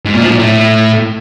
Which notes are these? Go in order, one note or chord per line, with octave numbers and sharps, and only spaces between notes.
G#2
A#2
F3
A#2
A2